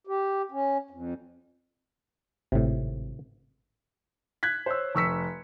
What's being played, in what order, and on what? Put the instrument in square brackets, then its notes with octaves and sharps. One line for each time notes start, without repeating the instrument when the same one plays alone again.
[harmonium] G4
C#4
F2
[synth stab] G#1 [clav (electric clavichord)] A2 C3
[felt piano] F#6 G#6 B6
C5 C#5 E6
F1 C#6 E6 B6 C#7